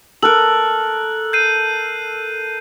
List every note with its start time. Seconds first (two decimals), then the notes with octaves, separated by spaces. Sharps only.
0.22 A4 A#4 F#6 F#7
1.33 G6 C7 D#7